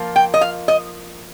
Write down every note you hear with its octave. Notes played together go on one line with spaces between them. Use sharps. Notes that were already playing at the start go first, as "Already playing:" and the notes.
Already playing: F3 A#3 F4
G5
D#5
F5
D#5